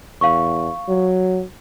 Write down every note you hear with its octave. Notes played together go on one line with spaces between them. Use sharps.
E2 F5 C#6
F#3